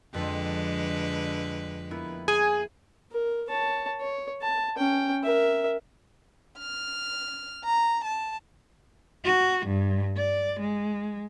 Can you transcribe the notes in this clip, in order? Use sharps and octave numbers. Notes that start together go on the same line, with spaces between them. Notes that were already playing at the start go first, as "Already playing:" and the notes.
F2 D3 G#3 B4
A#3 B3 E4
G#4 G#5
A#4
C#5 A5
C#5
A5
C#4 G5
A#4 E5
F6
A#5
A5
F#4
G2
D5
G#3